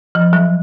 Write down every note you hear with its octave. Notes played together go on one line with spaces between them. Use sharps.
F3
F#3